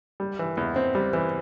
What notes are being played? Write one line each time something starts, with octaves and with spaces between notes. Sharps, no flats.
G3
E3
E2
C4
G3
E3